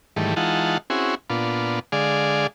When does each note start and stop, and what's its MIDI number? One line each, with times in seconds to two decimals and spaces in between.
0.16 0.35 44
0.16 0.35 51
0.16 0.35 52
0.16 0.35 55
0.16 0.35 57
0.36 0.78 52
0.36 0.78 56
0.36 0.78 63
0.36 0.78 65
0.36 0.78 78
0.36 0.78 81
0.90 1.15 60
0.90 1.15 61
0.90 1.15 64
0.90 1.15 66
0.90 1.15 68
1.30 1.79 46
1.30 1.79 59
1.30 1.79 62
1.30 1.79 65
1.92 2.47 50
1.92 2.47 56
1.92 2.47 68
1.92 2.47 74
1.92 2.47 77